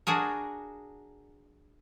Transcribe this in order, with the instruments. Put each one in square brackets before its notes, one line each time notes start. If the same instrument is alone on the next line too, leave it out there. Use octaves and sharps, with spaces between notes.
[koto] D4 F#4 G#4 A#4